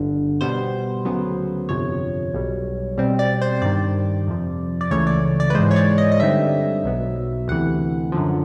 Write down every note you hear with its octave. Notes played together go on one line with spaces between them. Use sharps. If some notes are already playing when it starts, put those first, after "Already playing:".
Already playing: G1 G2 D3
B2 G3 B3 C5
D2 C#3 F#3 B3
G1 F2 C3 F3 C#5
B1 B2 G3
B2 G3 C4
D5
C5
G2 D#3 G3 D5
F2 C3 F3
D5
C#2 C#3 E3 A3 C#5
D5
D5
B4
G#2 E3 G#3 C5
C#5
D5
D#5
D#5
G2 D3 G3 C4 D#4 E5
B1 B2 F#3 B3
D2 C3 E3 F#5
F#2 D3 F3